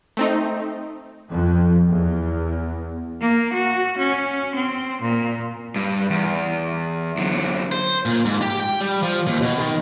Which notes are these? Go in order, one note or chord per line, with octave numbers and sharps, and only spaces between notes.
A3 C4 D#4
F2
E2
A#3
F#4
C#4
C4
A#2
G2
E2
F#2 D3
C5
A#2
G#2
G4
G5
G3
F3
D#2
B2
D#3